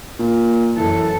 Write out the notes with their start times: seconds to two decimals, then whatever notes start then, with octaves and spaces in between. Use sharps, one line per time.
0.19 A#2
0.77 F#2 E3 A4